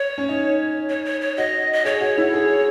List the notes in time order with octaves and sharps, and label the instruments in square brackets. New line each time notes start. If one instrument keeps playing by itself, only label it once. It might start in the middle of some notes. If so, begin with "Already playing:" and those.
Already playing: [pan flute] C#5
[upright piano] C#4
D#4
[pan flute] C#5
C#5
C#5
[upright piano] F#4 [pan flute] D#5
[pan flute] D#5
[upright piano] G#4 [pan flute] C#5
[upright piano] F#4
E4
G#4